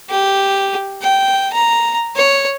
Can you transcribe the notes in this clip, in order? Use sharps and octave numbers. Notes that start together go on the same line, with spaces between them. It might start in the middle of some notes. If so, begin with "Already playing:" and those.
G4
G5
A#5
C#5